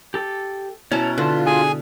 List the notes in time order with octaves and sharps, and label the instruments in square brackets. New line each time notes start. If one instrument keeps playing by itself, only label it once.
[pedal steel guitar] G4 A4
[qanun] B2 C#4 E4 [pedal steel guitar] C#5 A5 A#5
[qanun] D3 [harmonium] F4 [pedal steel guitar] B4 A5
[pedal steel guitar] D4 F#4 [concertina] G#4 G#5